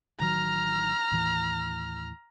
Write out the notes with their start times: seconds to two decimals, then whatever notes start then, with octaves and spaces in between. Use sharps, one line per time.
0.20 A1 D#3 F#3 A#5 F6
1.12 D#2 A2 E3